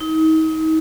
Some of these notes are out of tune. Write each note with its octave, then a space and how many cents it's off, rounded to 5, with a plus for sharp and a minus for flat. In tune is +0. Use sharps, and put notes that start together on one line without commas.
D#4 +35